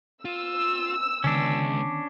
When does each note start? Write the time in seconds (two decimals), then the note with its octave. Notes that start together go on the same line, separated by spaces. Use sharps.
0.25 F4 E6
1.24 C#2 D3 D#3 B3 C#4 D4